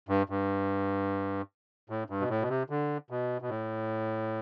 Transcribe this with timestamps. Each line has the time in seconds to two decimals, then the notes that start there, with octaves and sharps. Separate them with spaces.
0.09 G2
0.29 G2
1.90 A2
2.10 G2
2.20 B2
2.29 A2
2.42 B2
2.49 C3
2.70 D3
3.10 B2
3.42 B2
3.49 A2